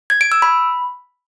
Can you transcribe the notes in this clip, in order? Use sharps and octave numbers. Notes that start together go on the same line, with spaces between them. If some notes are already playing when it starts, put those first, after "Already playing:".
G#6
D7
E6
B5